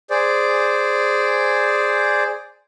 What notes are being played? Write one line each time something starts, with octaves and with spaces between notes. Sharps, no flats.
G#4 C5 D5